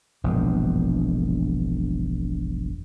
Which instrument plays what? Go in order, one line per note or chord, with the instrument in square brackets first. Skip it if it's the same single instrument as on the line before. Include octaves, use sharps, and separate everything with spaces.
[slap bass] E1 A#1 G2